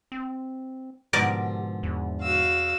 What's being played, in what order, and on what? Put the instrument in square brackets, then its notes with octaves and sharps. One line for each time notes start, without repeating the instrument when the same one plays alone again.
[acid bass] C4
[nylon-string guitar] G#2 D3 F3 [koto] B2 A#4 D5 [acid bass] G4
[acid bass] E2
[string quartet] F#4 F5 E6